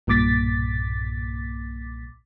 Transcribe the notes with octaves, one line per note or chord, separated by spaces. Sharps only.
B1 G2 A#2 D6 A6 B6